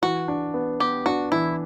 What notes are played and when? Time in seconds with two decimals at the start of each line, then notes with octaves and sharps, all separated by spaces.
0.02 E3 F#4
0.28 D4
0.54 B3
0.80 B3 G4
1.06 D4 F#4
1.32 E3 E4